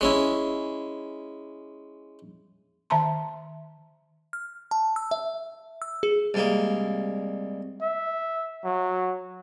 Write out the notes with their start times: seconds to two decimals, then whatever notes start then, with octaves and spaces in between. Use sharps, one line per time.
0.01 G#3 C#4 E4
2.90 D#3 E5 A5 A#5 C6
4.33 F6
4.71 A5
4.96 E6
5.11 E5
5.82 E6
6.03 G#4
6.34 C2 G#3 A#3
7.82 E5
8.64 F#3